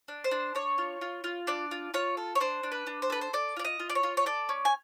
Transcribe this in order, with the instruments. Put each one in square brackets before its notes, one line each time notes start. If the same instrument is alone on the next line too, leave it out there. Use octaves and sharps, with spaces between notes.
[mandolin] D4
C5
D4
D4 C#5
F4
F4
F4
D4 D5
F4
F4 C#5
A4
C#5
D4 C5
D4
B4
D4
C5
A4 B4
C5
A4 D5
F4 D5
D#5
F4
D5
C#5
F4
C#5
A4 D5
C#4
G#5